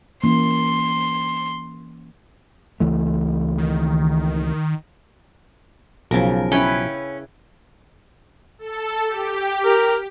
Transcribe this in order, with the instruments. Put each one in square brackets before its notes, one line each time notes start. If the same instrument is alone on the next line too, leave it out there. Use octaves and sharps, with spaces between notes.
[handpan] E3 A#3 C#4 [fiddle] C6
[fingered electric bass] C#2 E3 A3
[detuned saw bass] D#3
[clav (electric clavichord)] B1 F3 [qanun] C#3 A#4
[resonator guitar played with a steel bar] C#4 [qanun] E4 B4 G5
[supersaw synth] A4
G4
[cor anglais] A#4